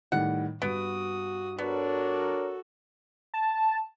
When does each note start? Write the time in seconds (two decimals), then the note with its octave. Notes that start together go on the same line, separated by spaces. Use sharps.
0.12 A2 D#3 G3 F#5
0.62 G2 B3 F#4 D#6 D7
1.59 B3 D4 F#4 A4 A#4 C#5
3.34 A5